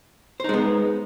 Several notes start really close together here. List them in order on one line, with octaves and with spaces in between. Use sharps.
C5 D#4 G#3 B3